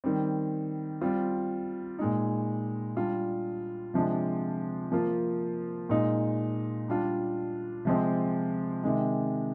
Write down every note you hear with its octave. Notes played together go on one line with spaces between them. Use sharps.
D#3 G3 C4
G3 C4 F4
A#2 G#3 D#4
G3 D4 F4
C3 F3 G#3 D4
F3 A#3 F4
A#2 G#3 D#4
G3 D4 F4
C3 F3 G#3 C4
C3 D#3 G#3